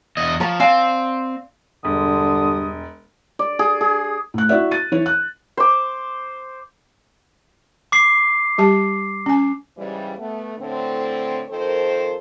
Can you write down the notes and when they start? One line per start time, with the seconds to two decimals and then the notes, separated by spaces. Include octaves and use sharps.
0.17 E2 D#5
0.40 F3 C#5 A#5
0.60 C4 D5 F5 G#5
1.85 E1 G2 D3 D#6
3.39 D5
3.59 G#4
3.81 G#4
4.34 A2 F#6
4.49 E4 F#4 D5 E5
4.71 A6 D#7
4.92 E3 E4 C#5
5.06 F#6
5.57 C5 D6
7.92 D6 C7
8.58 G3 G4 A5
9.26 C#4 G#5
9.77 G#2 C#3 E3 G3
10.18 A3 B3
10.57 A2 D3 C4
11.49 D#3 F3 C4 A4 A#4 C5